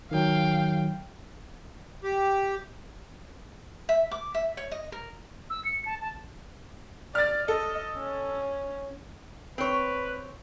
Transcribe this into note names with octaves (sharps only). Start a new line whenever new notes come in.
D#3 F#3 F5 G5
G4
E5
D6
E5
C#5
D#5
A#4
E6
C#7
A5
A5
D5 F6 A6
A4 D#5
C#4
C4 B4 C#5